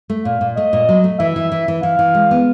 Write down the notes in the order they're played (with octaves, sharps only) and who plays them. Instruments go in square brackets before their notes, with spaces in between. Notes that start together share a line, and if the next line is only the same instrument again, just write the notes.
[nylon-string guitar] A3
[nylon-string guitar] A#2 [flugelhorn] F5
[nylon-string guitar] A#2
[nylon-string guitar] A3 [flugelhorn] D#5
[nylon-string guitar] A#2
F#3
A3
[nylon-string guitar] E3 [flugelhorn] E5
[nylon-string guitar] E3
E3
E3
[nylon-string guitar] E3 [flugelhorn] F5
[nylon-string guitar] E3
G#3
B3